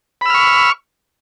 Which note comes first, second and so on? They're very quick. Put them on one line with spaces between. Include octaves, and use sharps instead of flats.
B5 E6 F6 C#6